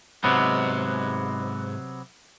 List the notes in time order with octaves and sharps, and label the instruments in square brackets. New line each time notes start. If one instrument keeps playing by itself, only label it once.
[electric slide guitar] G#2 [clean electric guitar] C3 F#3 B3